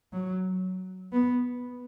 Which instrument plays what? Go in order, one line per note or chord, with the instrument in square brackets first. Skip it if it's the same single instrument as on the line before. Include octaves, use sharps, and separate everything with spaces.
[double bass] F#3
B3